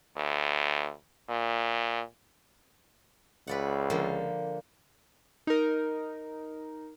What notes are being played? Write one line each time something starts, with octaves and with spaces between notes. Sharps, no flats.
D2
A#2
C#2 B4 D5 F#5
D3 F3 A#3
D#4 A#4